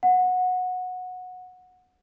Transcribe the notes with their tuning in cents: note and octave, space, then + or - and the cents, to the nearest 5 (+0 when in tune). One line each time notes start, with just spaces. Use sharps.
F#5 -15